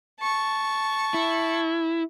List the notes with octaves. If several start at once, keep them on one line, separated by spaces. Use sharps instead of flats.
A5 C#6
E4